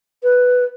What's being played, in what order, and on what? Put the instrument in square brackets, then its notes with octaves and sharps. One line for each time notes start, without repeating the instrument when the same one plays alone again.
[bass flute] B4